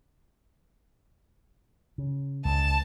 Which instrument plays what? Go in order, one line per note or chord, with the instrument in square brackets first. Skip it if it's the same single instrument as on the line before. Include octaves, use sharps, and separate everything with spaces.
[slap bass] C#3
[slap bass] C#2 [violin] A5